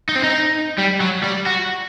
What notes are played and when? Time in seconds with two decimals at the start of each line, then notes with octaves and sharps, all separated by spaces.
0.09 D#4
0.16 C4
0.24 D#4
0.78 G3
1.00 F#3
1.23 G3
1.46 F#4